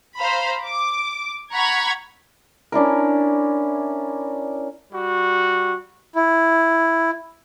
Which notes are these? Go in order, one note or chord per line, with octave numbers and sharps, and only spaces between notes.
C5 F5 A#5 B5
D6
F#5 A#5 B5 C#6 G#6
C#4 D4 E4 A#4
G3 F#4
E4